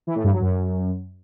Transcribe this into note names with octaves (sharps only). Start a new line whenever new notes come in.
E3
A2
G2
F#3
F#2